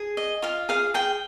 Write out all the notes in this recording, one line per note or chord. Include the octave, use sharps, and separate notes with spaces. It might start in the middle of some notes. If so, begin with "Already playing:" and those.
Already playing: G#4
D#5
F4 F5
G#4 F5
G#4 G5